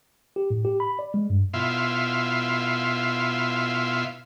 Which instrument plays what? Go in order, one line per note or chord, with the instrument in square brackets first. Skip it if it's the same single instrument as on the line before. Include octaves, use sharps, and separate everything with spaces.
[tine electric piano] G4
A2
G4
B5
D5
G#3
G2
[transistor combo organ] B2 E4 F4 E5 F5 C6